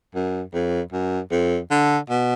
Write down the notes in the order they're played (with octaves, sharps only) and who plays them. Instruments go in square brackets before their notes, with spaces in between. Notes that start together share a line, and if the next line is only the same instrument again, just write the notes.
[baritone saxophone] F#2
F2
F#2
F2
D3
B2